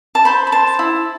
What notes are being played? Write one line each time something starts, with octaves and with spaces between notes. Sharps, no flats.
A5
C5 B5
B5
C5 A5
E4